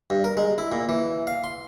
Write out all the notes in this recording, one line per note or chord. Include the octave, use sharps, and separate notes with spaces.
G2
A#4
G#3
E4
A#2
E3
F5
C6